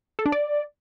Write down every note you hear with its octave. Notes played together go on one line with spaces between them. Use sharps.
A4
D4
D5